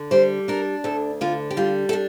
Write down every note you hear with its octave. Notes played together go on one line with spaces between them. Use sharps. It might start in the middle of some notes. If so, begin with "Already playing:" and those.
Already playing: D3
G3 C5
D4 A#4
D2 A4
D3 F4
G4
G3 F4
A4
D4